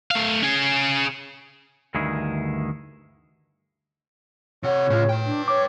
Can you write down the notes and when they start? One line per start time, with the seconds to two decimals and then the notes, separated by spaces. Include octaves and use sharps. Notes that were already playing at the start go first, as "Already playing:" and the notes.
0.11 A3 F5
0.43 C#4 G#4
1.95 D2 G2 D#3 E4 G#4
4.63 C3 C#5 F#5
4.90 A2 C#3 F4
5.09 B4 G5
5.25 D4
5.48 C#5 D6